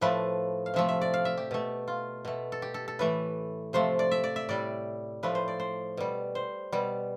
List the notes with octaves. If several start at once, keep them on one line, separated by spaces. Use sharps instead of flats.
A2 F3 A3 B4
F5
C3 F3 A3 E5
E5
D5
F5
E5
G4
B2 A3
F4
B2 A3
A4
G4
A4
A4
A2 E3 A3 B4
C3 F3 A3 C5
D5
E5
D5
E5
A2 G3 D5
A2 F3 A3 B4
C5
D5
C5
B2 G3
C5
B2 G3